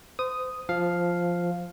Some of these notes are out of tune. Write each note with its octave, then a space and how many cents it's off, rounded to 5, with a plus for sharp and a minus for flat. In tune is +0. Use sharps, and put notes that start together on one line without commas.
C5 -35 D#6 +0
F3 +0 F5 +0